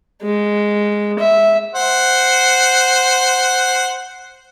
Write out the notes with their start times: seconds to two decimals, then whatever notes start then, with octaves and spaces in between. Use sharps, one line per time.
0.22 G#3
1.19 E5
1.75 C5 F#5